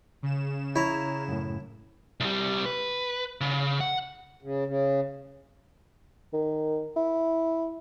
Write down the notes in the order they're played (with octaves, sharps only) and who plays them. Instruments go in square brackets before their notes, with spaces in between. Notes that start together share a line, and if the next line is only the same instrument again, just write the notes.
[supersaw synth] C#3 E7
[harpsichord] E4 [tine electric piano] C#5 A#5
[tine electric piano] F#2 A2
[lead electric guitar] C2 G3
B4
C#3
F#5
[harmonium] C#3
C#3
[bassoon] D#3
E4